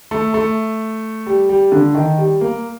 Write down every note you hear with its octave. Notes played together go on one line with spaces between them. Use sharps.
A3
A3
G3
G3
D3
D#3
G3
A#3